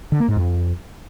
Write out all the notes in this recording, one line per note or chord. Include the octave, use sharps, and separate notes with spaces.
D3
A#3
G#2
F2